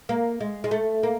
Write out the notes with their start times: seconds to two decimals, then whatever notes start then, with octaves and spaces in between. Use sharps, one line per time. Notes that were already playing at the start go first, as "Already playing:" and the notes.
0.09 A#3
0.41 G#3
0.64 G#3
0.71 A3
1.03 A#3